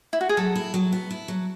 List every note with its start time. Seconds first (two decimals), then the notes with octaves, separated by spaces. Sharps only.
0.13 E4
0.21 F#4
0.29 G#4
0.37 F#3 A4
0.56 E4
0.74 F#3
0.92 B3
1.11 E4
1.28 F#3